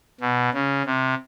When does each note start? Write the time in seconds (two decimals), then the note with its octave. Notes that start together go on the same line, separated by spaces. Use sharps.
0.21 B2
0.53 C#3
0.86 C3